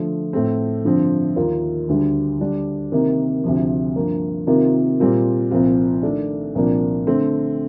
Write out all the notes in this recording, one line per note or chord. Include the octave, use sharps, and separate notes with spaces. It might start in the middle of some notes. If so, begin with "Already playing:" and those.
Already playing: D3 F3 A3
A2 A3 C4
G2 D3 F3 C4
D#2 D#3 A#3 F4
D2 D3 G3
D3 G3 D4
C3 D#3 A#3
D2 C3 F3
G2 F3 A#3
C3 D#3 A#3 F4 A#4
A#2 G3 C4 F4 A#4
C2 A#2 F3 C4 F4
D#3 A3 D4 A4
C2 A#2 F3 A#3 D4
D3 A3 C4